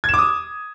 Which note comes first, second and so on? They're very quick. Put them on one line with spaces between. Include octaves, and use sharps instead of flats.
G#6 E7 D6 D#6